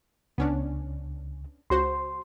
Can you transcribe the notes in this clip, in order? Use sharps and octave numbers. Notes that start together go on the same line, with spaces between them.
C#2 B3 C#4 D4
C#2 F#4 C5 C6